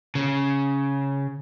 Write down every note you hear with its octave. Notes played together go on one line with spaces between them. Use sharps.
C#3